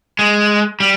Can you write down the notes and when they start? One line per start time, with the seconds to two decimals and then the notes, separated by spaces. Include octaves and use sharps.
0.19 G#3
0.80 G3